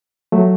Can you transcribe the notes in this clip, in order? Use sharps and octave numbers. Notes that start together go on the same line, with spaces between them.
F#3 A3